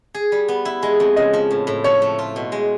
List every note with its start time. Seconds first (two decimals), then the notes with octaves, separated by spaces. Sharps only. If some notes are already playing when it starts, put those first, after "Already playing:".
0.14 G#4
0.32 G3
0.48 B3
0.65 E4
0.83 G#3
1.00 F2
1.16 C#3 D#5
1.34 F3
1.51 A2
1.67 A2
1.84 F3 C#5
2.02 A3
2.19 F4
2.36 B2
2.52 G#3